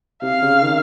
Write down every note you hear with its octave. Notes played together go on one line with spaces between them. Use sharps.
C3 F5
C#3
D#3